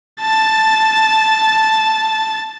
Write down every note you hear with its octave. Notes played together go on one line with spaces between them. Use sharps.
A5 A6